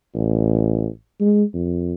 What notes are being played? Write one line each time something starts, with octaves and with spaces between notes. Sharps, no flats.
A1
G#3
F2